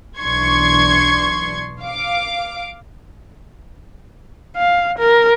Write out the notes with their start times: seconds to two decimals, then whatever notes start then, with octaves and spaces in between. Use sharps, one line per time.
0.20 B1 E3 D4 C6 C#6 G#6
1.81 F5 D6
4.57 F5
4.98 A#4